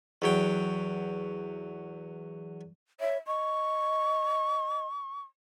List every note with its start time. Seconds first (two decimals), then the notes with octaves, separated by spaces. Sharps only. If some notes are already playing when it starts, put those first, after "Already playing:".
0.22 E2 F#3 G5
3.00 C#5 E5
3.27 D#5 C#6